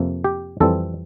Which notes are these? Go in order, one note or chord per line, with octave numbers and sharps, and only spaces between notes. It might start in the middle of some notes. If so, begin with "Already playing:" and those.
Already playing: F2 C3 F3 A#3
G4
F2 E3 G3 C4 A4